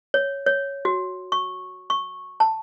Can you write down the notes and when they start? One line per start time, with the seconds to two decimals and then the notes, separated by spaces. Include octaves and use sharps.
0.14 C#5
0.46 C#5
0.85 F#4
1.32 C#6
1.90 C#6
2.40 A5